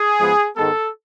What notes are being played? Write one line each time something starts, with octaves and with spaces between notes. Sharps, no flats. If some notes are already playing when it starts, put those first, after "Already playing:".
Already playing: G#4
G#2 F3 G#3 B3
G#2 D#3 G#3 B3 A4